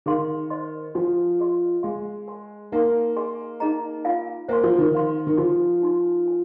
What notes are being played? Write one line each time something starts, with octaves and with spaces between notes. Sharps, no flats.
D#3 G#4 F5 C6
C5 D#5 C6
F3 A#4 G#5 C6
G#4 D#5 C6
G#3 G#4 F5 C6
A#4 G#5 C6
A#3 D#4 A#4 F5 C6
G#4 D#5 G#5 C6
D#4 G#4 D#5 A#5
F4 A#4 F5 G#5
A#3 C5 F5 G#5 C6
F3
D#3
C5 F5 C6
D#3
F3 F4 A#4 G#5 C6
D#4 A#4 G#5 C6
A#4 G#5